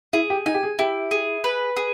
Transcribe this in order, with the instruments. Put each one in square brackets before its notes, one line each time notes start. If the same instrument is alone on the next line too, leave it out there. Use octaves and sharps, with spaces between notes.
[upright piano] E4 [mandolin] G#4
[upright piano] G4
[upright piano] D#4 [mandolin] G#5
[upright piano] G4
G#4
[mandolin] E4 [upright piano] G4
[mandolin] G#4
B4
G#4